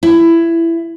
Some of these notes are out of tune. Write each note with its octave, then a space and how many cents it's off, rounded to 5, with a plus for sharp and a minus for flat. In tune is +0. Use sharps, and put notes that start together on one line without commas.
E4 +15